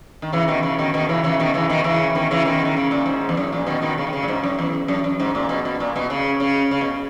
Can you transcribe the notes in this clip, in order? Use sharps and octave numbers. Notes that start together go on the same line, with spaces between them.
D#3
C#3 E3
B2 D#3
C#3
B2 D#3
B2 D#3
C#3 E3
C#3 E3
B2 D#3
C#3 E3
B2 D#3
C#3 E3
B2 D#3
C#3 E3
B2 D#3
D#3
C#3
A#2
G#2
E2
F#2
A#2
B2 D#3
B2 D#3
C#3
D#3
C#3
A#2
G#2
F#2
E2
F#2
F#2
G#2
A#2
B2
B2
A#2
B2
C#3
C#3
C#3
B2